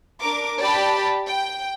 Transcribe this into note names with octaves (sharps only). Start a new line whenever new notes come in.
D4 A#4 D6
G4 D5 G5 A5 B5
G5